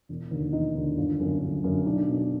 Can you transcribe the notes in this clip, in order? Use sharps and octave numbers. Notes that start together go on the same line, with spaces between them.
E1
D#2 D3
E1 D#4
D#2 D3
G1
F#2 D3
G1
F#2 D3
B1 D4
B2